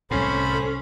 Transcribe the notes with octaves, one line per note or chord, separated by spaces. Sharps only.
C2 A2 C#4 A4 C5 B5